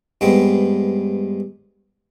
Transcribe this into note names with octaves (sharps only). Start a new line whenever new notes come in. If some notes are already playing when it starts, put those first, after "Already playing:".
G2 G#3 B3 C4